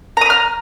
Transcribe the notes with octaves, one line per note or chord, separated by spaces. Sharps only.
A#5 B5 D#6 F6